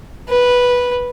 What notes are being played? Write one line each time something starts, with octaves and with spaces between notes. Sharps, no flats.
B4